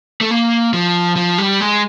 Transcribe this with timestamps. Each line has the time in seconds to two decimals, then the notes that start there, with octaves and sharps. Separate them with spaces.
0.21 A3
0.31 A#3
0.73 F3
1.16 F3
1.38 G3
1.60 G#3